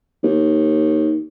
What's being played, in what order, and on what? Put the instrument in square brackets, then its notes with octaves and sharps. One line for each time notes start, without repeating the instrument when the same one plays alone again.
[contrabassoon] D#2